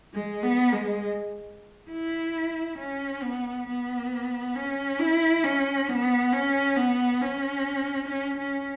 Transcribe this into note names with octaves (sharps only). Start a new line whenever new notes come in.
G#3
B3
G#3
E4
C#4
B3
B3
C#4
E4
C#4
B3
C#4
B3
C#4
C#4
C#4